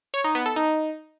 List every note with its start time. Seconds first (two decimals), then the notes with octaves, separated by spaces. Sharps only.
0.14 C#5
0.24 D#4
0.35 B3
0.46 A4
0.56 D#4